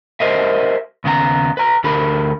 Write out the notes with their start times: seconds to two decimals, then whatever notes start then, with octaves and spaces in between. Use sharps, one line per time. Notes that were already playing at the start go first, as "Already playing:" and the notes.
0.20 G4 A#4 C5 D#5 E5
1.04 D#2 C#3 B3 F#4 A#5
1.57 B4 A#5
1.84 D2 D4 G4 A#4 B5